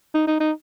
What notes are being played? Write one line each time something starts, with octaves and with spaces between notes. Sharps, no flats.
D#4
D#4
D#4